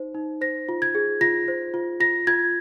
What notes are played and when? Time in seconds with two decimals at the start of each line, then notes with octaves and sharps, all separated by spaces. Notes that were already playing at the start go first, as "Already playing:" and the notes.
Already playing: D#4 C5
0.14 D#4
0.41 C5 A#6
0.69 F4
0.82 G#6
0.95 G#4
1.21 F4 A#6
1.48 C5
1.74 F4
2.00 F4 A#6
2.27 F4 G#6